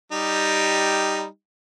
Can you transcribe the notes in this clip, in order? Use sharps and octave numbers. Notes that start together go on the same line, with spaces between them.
G3 D#4 G4